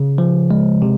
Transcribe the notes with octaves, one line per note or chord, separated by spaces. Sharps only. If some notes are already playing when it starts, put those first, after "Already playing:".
Already playing: C#3
F3
G#3
C3